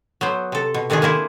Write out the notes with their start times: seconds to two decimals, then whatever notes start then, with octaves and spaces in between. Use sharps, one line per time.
0.21 F#3 B3 C5
0.52 C3 A4
0.74 B2
0.90 C3 D#3 A3 D4 G#4
1.02 A#3 C4 E4 G#4